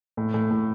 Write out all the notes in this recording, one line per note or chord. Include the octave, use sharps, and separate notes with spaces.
A2
A2
A2